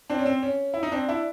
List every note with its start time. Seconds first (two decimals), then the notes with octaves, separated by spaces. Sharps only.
0.10 C4 D4
0.19 C#4
0.26 C4
0.43 C#4
0.74 E4
0.83 D#4
0.92 C4 D4
1.09 D4 E4